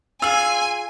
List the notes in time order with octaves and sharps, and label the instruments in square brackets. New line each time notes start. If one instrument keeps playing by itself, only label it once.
[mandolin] F4 G#4 [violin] G#5 [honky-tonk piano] E6